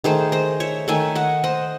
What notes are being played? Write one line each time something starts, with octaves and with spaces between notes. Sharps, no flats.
D#3 A3 G#4 C5
C5 D#5
C#5 E5
D#3 A3 E5 G#5
D#5 F#5
C5 D#5